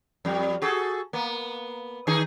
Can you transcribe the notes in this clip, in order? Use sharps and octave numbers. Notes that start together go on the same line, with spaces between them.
F2 G3
F#4 G#4 A4
A#3 B3
D#3 D#4 G#4